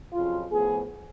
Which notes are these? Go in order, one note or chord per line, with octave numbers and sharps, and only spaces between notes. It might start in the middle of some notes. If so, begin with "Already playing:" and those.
F2 C#3 F#3 F4
A2 F3 B3 G#4